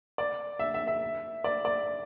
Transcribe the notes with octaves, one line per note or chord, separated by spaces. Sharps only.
D5
E5
E5
E5
D5
D5